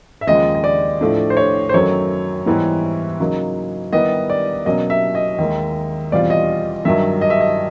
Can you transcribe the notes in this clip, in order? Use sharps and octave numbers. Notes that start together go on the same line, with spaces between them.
E5
D#2 C#3 F3 G#3 D#5
D#5
D5
A2 F3 A3 D4
C5
C#5
C5
F#2 D#3 F#3 A3 C#5
G#2 E3 G3 B3 E4
C#3 F#3 A#3 D#4
D#3 G3 B3 E4 G4 D#5
D5
B2 F#3 A#3 C#4 D#5
E5
D#5
D#2 D#3 G#3
E2 B2 G3 C4 F4 D5
D#5
G2 D#3 F#3 E5
D#5
E5
D#5